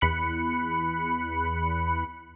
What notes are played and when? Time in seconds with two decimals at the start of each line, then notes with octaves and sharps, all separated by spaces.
0.01 E2 B5 F#6 C#7